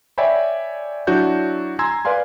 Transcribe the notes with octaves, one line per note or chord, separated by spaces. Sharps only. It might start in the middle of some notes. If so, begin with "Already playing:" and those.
C#5 D5 E5 G5 G#5 B5
F#3 D4 E4 F#4 C#5 G6
G#5 A#5 C6 E6 G#6
B4 D5 F5 G#5 C6